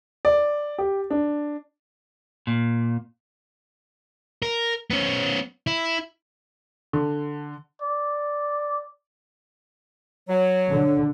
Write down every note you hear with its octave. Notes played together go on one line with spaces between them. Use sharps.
D5
G4
D4
A#2
A#4
B3 C#4
E4
D3
D5
F#3 C#5
D3